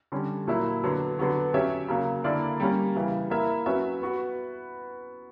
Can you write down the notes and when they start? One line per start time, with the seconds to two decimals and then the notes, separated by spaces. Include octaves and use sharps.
0.12 D3 G3 C#4
0.47 A#2 F#3 A#3 E4
0.83 D3 F#3 B3
1.19 D3 F#3 B3 F#4
1.53 F#3 C#4 G4 C#5 E5
1.88 C#3 F#3 A#3
2.24 D3 A#3 E4 A#4 D5
2.60 G3 A#3 C#4
2.95 C#3 E3 G3
3.30 A#3 E4 A#4 E5
3.66 F#3 C#4 F#4 B4 E5
4.01 B3 F#4 B4